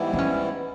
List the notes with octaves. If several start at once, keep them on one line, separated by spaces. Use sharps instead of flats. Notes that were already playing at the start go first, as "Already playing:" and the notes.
Already playing: G#2 E3 G3 B3 E4
D4
C#4